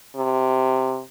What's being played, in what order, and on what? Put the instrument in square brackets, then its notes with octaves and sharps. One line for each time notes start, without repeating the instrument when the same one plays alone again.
[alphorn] C3